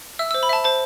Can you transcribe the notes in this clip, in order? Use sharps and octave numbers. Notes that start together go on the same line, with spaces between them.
E5 E6
C5 E6
B5
E5 A5
C5 A5